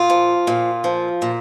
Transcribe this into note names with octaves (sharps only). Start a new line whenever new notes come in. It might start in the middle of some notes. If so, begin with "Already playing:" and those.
Already playing: A#2 F4
F3
A#2
F3
A#2